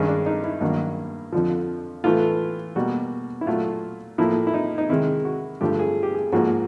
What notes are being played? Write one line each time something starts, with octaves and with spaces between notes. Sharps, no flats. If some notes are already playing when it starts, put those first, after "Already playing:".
Already playing: G2 D#3 G#3 C#4
D4
D#4
E4
G2 D#3 F#3 A#3
F2 D3 F3
A2 E3 A3 F4
B2 G3 A#3 F#4
E4
A#2 F#3 A3 F4
A2 F3 A#3 E4
E4
D#4
D#4
C3 D#3 G#3 E4
F#4
G2 D3 F3 A3 G4
G#4
G4
G#4
G#2 F3 A#3 F#4